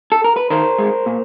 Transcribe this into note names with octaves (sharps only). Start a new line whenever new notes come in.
A4
A#4
B4
D#3 A#4 C5
G#3
A#2